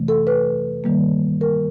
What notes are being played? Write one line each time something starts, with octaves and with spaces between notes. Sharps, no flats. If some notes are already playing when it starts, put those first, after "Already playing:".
Already playing: F2 C3 E3 A3
A4
B4
G2 D#3 G3 A#3
A#4